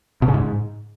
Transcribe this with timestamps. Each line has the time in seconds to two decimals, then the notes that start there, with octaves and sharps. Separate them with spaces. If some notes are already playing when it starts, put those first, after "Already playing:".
0.22 B2
0.28 C#3
0.34 G#2